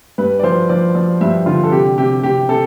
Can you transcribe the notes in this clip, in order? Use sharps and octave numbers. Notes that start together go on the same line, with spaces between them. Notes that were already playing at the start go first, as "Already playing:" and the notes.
G2 B4
D5
F3 C5
F3 D5
F3 D5
G2 E5
D3 F4
A4
C3 G4
C3 G4
C3 G4
C3 A4